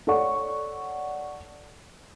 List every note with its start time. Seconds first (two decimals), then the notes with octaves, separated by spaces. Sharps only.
0.07 A4 C#5 D5 F#5 C#6